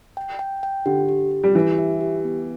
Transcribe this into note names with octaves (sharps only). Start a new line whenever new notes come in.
G5
G5
G5
D3 G4
G4
G4
G3
E3 G4
E5
G4
B3